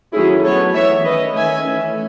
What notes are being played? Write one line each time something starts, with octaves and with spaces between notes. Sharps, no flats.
D#3 F#3 A3 C#4 E4 G#4
F#3 B3 A4 C#5
E3 B3 C#5 E5
D#3 A3 C#4 B4 D#5
D#3 A3 C#4 E5 G#5
E3 A3 C#4